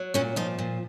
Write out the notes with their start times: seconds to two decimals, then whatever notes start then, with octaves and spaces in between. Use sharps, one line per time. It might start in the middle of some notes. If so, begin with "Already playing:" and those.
Already playing: F#3
0.14 A#2 C#4
0.36 F3 D#4
0.59 A#2